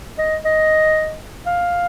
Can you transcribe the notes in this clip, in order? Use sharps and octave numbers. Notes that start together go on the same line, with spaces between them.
D#5
D#5
F5